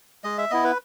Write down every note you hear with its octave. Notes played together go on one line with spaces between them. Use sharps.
G#3 D#5
E5
B3 E4 D#5
B4